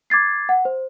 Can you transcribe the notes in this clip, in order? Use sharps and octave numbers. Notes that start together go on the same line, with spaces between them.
D6 G#6 A6 C7
F#5
C5